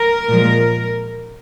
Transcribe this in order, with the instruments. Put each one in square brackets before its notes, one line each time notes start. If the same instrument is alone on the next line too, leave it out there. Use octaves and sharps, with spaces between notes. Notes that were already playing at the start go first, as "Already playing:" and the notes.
Already playing: [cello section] A#4
A#2 F3 G#3